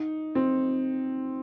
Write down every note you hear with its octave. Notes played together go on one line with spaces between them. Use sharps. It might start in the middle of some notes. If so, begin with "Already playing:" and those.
Already playing: D#4
C4